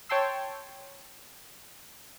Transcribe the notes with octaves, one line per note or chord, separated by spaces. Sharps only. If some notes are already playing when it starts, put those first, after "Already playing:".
C#5 G5 A5 C6 E6